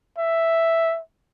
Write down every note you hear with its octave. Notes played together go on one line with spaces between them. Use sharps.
E5